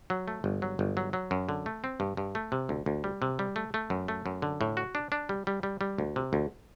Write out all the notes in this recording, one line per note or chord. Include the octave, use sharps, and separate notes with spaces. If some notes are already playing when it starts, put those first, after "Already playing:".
F#3
A3
G1
F#3
G1
F#3
F#3
F#2
D3
A3
C4
G2
G2
A3
C3
D2
D2
G3
C3
G3
A3
A3
F#2
A3
F#2
D3
A2
F#4
D4
D4
G3
G3
G3
G3
D2
C3
D2